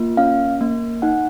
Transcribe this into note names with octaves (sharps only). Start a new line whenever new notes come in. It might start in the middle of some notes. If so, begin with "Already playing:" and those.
Already playing: A#3 F4
C#4 F5
A#3
D#4 F#5